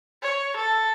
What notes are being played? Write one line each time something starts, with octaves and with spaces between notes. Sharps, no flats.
C#5
A4